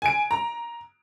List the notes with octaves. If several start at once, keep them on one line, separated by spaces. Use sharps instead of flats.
G#5 D7
A#5